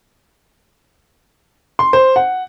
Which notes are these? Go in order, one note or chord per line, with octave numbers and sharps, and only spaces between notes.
C6
C5
F#5